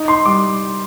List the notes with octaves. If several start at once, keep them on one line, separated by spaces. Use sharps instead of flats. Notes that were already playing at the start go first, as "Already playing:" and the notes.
Already playing: D#4
C6
G3 D6